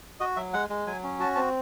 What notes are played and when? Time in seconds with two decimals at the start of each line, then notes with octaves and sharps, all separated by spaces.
0.20 F#4 D#5
0.36 F#3 E5
0.53 G#3 F#5
0.70 G#3
0.87 F#3 G#5
1.03 C#4
1.20 F#4 A5
1.35 C4 A5